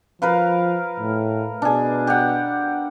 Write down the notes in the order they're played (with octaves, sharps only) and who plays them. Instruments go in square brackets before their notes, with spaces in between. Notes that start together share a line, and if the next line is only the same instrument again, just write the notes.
[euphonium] F3 [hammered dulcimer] A#4 B4 F5
[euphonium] A2
[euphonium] B2 [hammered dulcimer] D4 G#4
[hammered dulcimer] G4 F#5